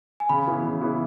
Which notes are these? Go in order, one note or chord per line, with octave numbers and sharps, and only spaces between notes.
G#5
C#3 B5
E3 B3
C#3
E3 B3